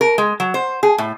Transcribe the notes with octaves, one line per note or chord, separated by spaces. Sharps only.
A#4
G#3
F#3
C5
G#4
A2